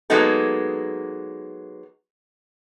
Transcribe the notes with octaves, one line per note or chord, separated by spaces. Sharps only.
F#3 G#3 A#3 B3 D#4 A4